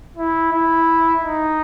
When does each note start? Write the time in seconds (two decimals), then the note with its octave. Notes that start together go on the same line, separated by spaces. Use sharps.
0.17 E4
0.52 E4
1.23 D#4